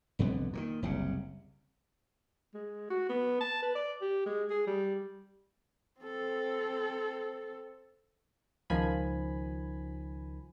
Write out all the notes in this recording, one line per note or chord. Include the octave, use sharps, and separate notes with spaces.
C2 F2 D3 B3
A#2 D3 D#3
F#1 C2 C#3
G#3
F#4
B3
A5
B4
D5
G4
G#3
G#4
G3
C4 A4
C#2 D#3 F3 G#5 B5